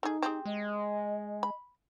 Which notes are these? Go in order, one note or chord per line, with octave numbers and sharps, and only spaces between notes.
A3 D#4 G#4
C4 G4 G#4
G#3 D#5
B5